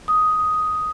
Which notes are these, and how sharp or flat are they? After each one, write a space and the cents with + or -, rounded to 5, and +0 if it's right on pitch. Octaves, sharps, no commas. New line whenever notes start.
D#6 +5